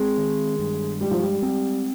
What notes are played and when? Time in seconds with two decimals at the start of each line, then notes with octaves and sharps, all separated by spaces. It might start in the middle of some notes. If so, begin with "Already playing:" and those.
Already playing: G#3 C4
0.18 D#3
0.59 G2
1.01 G3 G#3
1.11 F3
1.20 G3
1.42 G3 C4